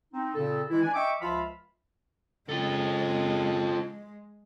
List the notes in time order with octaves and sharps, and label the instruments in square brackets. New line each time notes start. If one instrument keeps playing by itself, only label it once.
[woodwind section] C4 D#4
A#2 C#3 C4 A4
E3 G#3 E4
D4 G#5
D#5 E5 G5 C#6 D6
C#2 F3 F4 E5 F5 B5
[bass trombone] C#3 [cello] G#3 [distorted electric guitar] F4 A4